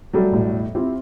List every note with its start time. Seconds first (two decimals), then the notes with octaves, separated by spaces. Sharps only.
0.13 F#3 G3 A3
0.31 E1 A1 A2
0.75 C4 E4 F4 G4